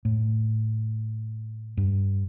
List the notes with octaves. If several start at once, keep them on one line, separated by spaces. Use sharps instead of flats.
A2
G2